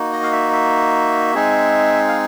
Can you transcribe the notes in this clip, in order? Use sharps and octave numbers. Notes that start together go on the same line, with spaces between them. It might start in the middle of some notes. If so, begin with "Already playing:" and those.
Already playing: A#3 D#4 F#4
D#5
F5
E5
E5
G#3 C4 D#4 G#4
F5